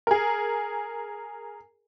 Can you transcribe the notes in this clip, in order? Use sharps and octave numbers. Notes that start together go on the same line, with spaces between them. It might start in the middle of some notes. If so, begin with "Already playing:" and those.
G#4 A#4